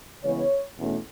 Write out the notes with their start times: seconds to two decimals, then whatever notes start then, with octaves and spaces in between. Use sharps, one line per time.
0.22 C#3 E3 G#3 B3 C#5
0.76 E2 B2 A3 C#4